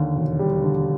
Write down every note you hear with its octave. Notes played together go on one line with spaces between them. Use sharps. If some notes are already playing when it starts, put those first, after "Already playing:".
Already playing: D#2 D3
E1
G3
D3